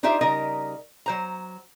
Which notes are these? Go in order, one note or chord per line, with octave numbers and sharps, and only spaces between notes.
D4 D#4 F4 G4 C5 E5
C#3 G3 D#4 A#4 D#5
F#3 C5 A#5